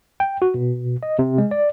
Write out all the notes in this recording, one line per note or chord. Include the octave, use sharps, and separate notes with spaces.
G5
F#4
B2
D#5
C3
G#3
D5